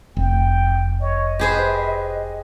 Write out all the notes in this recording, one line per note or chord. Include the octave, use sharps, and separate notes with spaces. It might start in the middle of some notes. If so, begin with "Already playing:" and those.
F1 G5
C#5 D#5
G4 G#4 B4 C5